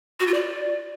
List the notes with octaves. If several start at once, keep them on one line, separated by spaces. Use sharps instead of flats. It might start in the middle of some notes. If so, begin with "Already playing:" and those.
F#4
F4
D5